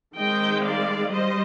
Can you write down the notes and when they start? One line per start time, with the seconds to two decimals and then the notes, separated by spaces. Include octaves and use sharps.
0.16 D#3 G#3 C4 D#5 G5
0.63 D5 F5
1.11 G3 C5 D#5